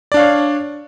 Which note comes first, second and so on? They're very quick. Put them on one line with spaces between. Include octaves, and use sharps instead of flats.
D5 D4 F5 C#5